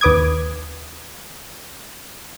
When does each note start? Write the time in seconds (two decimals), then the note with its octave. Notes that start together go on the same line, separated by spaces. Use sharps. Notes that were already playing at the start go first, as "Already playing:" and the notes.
0.01 D#2 B4 D6 D#6 G#6